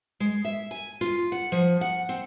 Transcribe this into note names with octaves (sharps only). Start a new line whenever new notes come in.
G#3
E5
G#5
F4
F#5
F3
F#5
C4